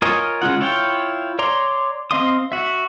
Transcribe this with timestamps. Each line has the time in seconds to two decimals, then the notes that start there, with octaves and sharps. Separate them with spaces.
0.02 F4 A#4 C#5 D#5 G#5
0.42 C#3 G#3 F4 F#5
0.61 E4 F4 C#5 F5 G5
1.39 C#5 D5 A#5 C6
2.11 C4 D#5 F5 C6 D#6
2.52 F#4 E5